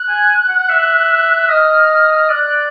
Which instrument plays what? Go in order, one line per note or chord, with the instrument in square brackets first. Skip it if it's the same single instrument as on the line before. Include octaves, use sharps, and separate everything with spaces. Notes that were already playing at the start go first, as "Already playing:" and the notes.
Already playing: [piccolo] F#6
[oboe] G#5
F#5
E5
[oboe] D#5 [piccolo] F6
[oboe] D5 [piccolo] F#6